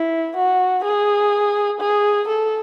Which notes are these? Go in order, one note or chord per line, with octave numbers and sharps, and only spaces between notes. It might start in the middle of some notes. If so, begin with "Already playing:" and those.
Already playing: E4
F#4
G#4
G#4
A4